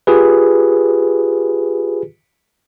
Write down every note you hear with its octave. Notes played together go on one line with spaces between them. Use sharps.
F4 G4 G#4 B4